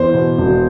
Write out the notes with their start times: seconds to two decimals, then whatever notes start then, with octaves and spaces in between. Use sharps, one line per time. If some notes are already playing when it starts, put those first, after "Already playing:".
Already playing: E2 C5
0.14 B2
0.38 E1